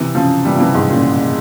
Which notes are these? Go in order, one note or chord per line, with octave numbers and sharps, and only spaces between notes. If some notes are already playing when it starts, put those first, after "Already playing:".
Already playing: C3 E3
C#3 F3
E3 G3
F3
C3 E3
G#2 C3
A#2 C#3